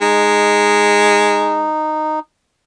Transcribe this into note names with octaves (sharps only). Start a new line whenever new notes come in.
G#3 D#4